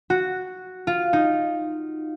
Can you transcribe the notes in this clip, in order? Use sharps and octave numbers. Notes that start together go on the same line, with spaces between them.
F#4
F4
D#4